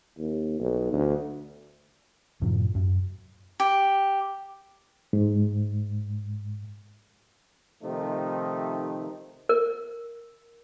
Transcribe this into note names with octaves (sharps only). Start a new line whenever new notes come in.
D#2
B1
D2
F#2 A2 C3 F3
F#2
G4
G#2
C3 D#3 F3 A3 D#4
A#4